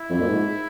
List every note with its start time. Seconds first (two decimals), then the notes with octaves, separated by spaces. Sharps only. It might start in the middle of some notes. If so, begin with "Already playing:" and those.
Already playing: E4
0.10 F2
0.21 A#2
0.28 G#2